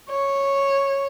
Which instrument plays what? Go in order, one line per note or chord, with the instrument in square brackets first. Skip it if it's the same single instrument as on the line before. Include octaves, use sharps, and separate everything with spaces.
[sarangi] C#5